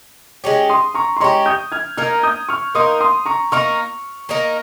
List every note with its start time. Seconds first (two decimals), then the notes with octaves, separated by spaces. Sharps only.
0.44 G#3 C#4 G4
0.69 C6 D#6
0.94 A#5 C#6
1.17 C6
1.20 G#3 C#4 G4 A#5 C#6
1.46 D#6 G6
1.72 F6 G#6
1.97 A#3 D#4 A#4 F6 G#6
2.23 D#6 G6
2.49 C#6 F6
2.75 A#3 D#4 A#4 C6 D#6
3.00 C6 D#6
3.26 A#5 C#6
3.52 A#3 D#4 A#4 C#6 F6
4.29 A#3 D#4 A#4